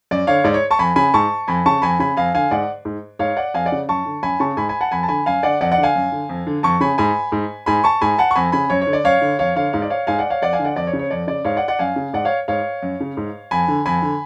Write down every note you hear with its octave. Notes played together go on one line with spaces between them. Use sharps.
F#2 D5
D3 C#5 F5
G#2 D5
C#5
A5 C#6
F2 G#5 B5
C#3 G#5 B5
G#2 A5 C#6
F2 G#5 B5
C#3 A5 C#6
F2 G#5 B5
C#3 G#5 B5
F2 F5 G#5
D3 F5 G#5
G#2 D5 F#5
G#2
G#2 C#5 F5
D5 F#5
F2 F5 G#5
D5 F#5
C#3
F#2 A5 C#6
D3
F#2 G#5 B5
C#3 A5 C#6
G#2 G#5 B5
G#5 B5
F#5 A5
F2 G#5 B5
A5
D3 G#5 B5
F#2 F5 G#5
D3 D5 F#5
F2 D5 F#5
D5 F#5
D3
F5 G#5
F#2
D3
F2
D3
F2 A5 C#6
C#3 G#5 B5
G#2 G#5 B5
G#2
G#2 G#5 B5
A5 C#6
G#2 G#5 B5
F#5 A5
C#6
F2 G#5 B5
C#3 G#5 B5
F#2 C#5
C#5
D3
D5
F#2 C#5 F5
D3
F2 C#5 F5
D3 C#5 F5
G#2 F5
D5
C#5 F5
G#2 F5 G#5
D5 F#5
C#5 F5
F2 D5 F#5
F5 G#5
D3
D5 F#5
F2 D5
C#5
C#3
C#5
F2 D5
C#3 D5
G#2 C#5 F5
D5 F#5
D5 F#5
F#2 F5 G#5
C#3
G#2 D5 F#5
C#5 F5
G#2 C#5 F5
F#2
C#3
G#2
F2 G#5 B5
D3
F2 G#5 B5
D3